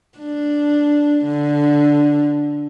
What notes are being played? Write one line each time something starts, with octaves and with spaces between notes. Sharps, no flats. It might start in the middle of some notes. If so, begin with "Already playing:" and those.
D4
D3